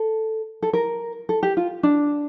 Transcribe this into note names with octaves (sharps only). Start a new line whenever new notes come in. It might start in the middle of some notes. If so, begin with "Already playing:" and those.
Already playing: A4
A4
A#4
A4
G4
F4
D4